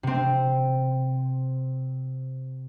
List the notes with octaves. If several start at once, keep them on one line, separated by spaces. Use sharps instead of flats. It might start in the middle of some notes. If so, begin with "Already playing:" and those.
C3 C4